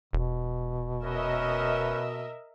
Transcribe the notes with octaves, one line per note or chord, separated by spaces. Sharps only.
E1 B2
C#4 A#4 B4 D#5 E5